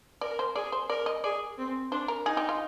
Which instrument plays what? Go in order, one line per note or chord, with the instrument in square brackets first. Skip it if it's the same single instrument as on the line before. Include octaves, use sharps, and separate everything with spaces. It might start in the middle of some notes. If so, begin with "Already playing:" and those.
[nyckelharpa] A#4 [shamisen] D5
[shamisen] C5
[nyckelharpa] G#4 [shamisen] D5
[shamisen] C5
[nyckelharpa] A#4 [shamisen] D5
[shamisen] D#5
[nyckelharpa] G#4 [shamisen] D5
[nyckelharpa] C4
[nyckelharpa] D4 [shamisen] C5
[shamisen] A#4
[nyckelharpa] D#4 [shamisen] G#4
[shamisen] G4
F4